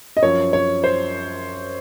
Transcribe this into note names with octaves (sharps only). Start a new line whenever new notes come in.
D#5
F#2 F3 C#5
C#5
C5